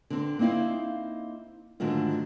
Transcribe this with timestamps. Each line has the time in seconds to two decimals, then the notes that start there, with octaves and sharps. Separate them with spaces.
0.10 D3 C4
0.39 A#3 C4 D#4 E4 F5
1.80 G#2 D3 D#3 F#3 A3 F4